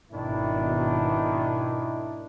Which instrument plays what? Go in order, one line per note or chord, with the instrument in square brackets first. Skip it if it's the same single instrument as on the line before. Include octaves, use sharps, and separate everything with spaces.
[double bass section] G#1 B2 [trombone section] D#3 D4 E4